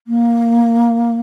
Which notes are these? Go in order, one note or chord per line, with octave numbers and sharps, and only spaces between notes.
A#3